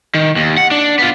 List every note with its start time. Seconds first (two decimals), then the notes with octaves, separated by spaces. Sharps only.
0.15 D#3
0.36 D#2
0.58 F#5
0.71 D4
0.99 B3 F4